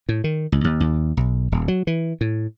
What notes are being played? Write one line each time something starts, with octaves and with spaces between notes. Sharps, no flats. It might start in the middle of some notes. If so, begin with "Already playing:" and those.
A2
D#3
C#2
D#2
D#2
B1
D#1
F#3
E3
A2